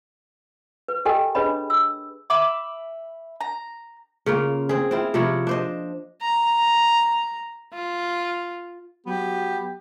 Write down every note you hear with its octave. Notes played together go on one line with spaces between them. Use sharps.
B4
G4 A4 A#4 D#5 G5 G#5
D4 G#4 B4 C#5 D#5 B5
E6
E5 B5 D6
A#5
C#3 A#3 F4
C4 G#4
C4 E4 F4
C3 F3 E4 C#5
D4 C5 D#5
A#5
F4
F#3 B3 G4